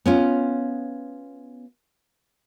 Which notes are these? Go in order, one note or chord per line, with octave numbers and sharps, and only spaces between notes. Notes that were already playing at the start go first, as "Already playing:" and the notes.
B3 C#4 F4